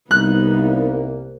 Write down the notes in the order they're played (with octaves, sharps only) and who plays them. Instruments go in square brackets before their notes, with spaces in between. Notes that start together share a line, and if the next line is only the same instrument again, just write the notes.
[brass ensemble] C2 A#3 [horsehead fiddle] B3 D#4 [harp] F#6